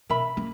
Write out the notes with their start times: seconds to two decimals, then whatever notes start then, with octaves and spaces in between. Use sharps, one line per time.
0.09 B2 A#4 E5 B5
0.37 A#3